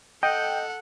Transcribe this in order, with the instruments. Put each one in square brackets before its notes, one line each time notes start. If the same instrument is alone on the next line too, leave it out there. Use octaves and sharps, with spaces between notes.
[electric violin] A4 F#5 [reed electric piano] D#5 [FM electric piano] G5